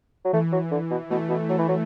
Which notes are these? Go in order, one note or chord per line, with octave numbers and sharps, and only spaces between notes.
F#3
E3 A3
F#3
D3
B2
B2 A3
B2
F#3 A3
E3
F#3